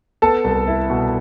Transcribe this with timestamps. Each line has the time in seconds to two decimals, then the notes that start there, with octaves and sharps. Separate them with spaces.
0.22 B3 A4 A5
0.44 C2
0.68 E4
0.90 B2